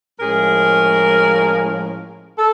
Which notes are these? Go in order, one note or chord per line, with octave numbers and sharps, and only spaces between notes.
A2 F3 G#3 C#4 G#4 A#4
A4